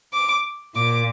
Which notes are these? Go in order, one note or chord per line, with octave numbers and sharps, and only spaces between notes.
D6
A#2 D6